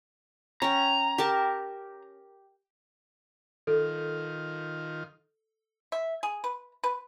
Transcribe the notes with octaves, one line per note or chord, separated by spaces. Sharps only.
C#4 G5 A#5
G4 A#4 A5
D#3 F4 A4
E5
G#4
B4
B4